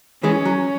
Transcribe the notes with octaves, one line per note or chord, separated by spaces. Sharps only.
E3 G#3 C#4
F#3